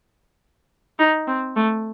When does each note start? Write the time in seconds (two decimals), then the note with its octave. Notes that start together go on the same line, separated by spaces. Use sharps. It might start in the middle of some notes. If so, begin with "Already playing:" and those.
0.99 D#4
1.28 C4
1.56 A3